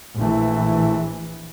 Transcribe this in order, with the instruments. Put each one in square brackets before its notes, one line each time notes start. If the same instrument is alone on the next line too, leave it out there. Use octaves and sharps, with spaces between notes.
[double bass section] A#1 E3 [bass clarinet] A3